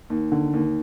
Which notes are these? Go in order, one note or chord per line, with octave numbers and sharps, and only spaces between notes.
D#2
D3
D#2